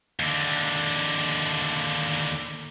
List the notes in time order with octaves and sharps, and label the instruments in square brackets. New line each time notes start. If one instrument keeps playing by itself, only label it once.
[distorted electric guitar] D#2 D3